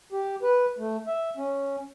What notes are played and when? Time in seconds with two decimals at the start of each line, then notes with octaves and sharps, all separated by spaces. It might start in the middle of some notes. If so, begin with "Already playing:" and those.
0.12 G4
0.43 B4
0.79 A3
1.07 E5
1.37 C#4